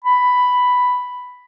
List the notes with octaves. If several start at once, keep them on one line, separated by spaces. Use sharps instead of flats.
B5